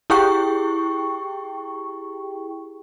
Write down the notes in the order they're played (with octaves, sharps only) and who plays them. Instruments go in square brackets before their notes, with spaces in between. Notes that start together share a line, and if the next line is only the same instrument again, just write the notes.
[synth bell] E4 G4 G#4 G5 C#6